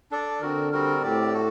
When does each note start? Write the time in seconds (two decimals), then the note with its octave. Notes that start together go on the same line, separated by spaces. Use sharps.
0.11 D4 A4 D5
0.41 D3 C4 F#4 A#4
0.72 G3 C4 F#4 A#4
1.03 A2 C4 G4 D5
1.34 F#4 A4